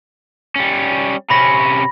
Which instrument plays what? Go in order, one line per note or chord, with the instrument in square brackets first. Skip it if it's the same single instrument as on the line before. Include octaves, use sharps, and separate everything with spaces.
[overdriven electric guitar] G3 C#4
[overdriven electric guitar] C3 C#4 [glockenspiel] B5 A#6